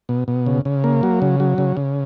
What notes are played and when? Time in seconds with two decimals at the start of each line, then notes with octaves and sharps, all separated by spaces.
0.09 B2
0.28 B2
0.46 C#3
0.65 C#3
0.84 A#3
1.03 F#3
1.22 C#3
1.40 F#3
1.58 C#3
1.77 C#3